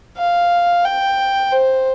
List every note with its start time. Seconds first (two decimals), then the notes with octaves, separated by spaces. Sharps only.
0.18 F5
0.85 G5
1.52 C5